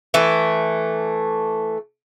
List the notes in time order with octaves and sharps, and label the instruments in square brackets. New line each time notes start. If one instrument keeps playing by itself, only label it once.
[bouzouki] E3 A3